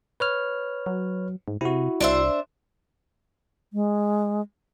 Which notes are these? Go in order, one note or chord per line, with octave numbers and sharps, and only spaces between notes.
B4 C#5 F6
F#3
G#2
C3 E4 F#4
C2 D4 C5 E5
G#3